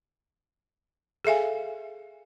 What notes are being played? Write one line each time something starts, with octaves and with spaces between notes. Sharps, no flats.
G#4 A4 E5 F5 G#5